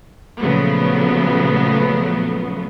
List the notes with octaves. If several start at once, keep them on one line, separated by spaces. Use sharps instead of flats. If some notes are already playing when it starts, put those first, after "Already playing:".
A#2 C#3 F3 F#3 A3 B3